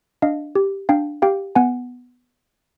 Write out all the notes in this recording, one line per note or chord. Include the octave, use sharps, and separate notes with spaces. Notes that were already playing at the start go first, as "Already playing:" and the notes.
D4 D#5 F5
G4
D4 F5 G5
G4 F5 G5
B3 F#5 G#5